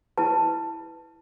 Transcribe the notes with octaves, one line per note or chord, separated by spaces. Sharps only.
E4 B4 A5